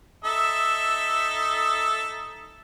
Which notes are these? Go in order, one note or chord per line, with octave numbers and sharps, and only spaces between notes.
D#4 A4 E5